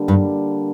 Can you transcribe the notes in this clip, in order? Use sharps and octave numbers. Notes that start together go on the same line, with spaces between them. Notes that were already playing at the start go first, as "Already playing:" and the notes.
Already playing: D3 G3 A#3 D4
G2